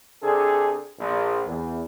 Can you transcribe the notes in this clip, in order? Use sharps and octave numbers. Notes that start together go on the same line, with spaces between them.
C3 D4 G#4 A4
A#1
E2